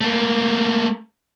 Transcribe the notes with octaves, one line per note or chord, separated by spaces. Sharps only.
A3 A#3